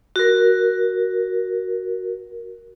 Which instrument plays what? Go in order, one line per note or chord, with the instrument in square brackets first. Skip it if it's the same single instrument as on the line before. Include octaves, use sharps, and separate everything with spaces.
[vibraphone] F#4 A#4